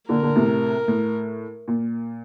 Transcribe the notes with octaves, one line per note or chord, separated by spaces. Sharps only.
A#2 D3 A#4
A#2 D3
A2 C3
A2
A#2